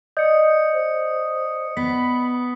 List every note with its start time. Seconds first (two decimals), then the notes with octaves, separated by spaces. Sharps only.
0.17 D5 D#5 D#6 G6 C#7
0.73 C5
1.77 B3 B5 B6